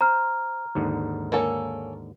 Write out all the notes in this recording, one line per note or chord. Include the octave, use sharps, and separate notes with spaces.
C5 A#5 F6
D#2 G#2 D3
A#3 C#4 A4